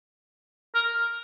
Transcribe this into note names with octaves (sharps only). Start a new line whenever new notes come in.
A#4